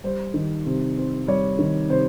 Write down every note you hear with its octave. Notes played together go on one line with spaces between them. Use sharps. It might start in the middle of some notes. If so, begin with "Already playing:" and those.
G3 C5
D#3
C3
C4
G3 C#5
D#3
C3 C5